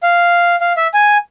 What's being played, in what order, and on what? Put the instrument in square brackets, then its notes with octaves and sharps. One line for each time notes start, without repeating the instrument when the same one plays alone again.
[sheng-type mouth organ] F5
F5
E5
G#5